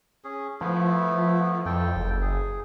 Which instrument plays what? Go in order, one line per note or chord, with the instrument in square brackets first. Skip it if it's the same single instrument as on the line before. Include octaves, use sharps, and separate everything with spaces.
[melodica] C#4 G#4
[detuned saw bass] F3 [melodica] A3 B3 E4
[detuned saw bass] F2 [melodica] A4 G5
[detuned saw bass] F#1
[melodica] G#4